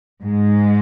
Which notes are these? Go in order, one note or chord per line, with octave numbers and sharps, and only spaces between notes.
G#2 G#3